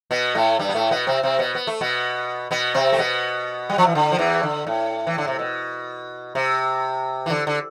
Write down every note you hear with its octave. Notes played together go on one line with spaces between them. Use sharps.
B2 B3
A2 A3
G2 G3
B3
A2 A3
B2 B3
C3 C4
C3 C4
B2 B3
B3
A3
B2 B3
B2 B3
C3 C4
A3
B2 B3
G3
F3
E3
D3
F3
E2 E3
D3
A2
E3
D3
C3
B2
C3
E3
D3
D3